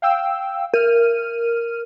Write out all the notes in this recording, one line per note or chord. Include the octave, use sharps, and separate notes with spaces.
F5 G5 E6
A#4 F6 D#7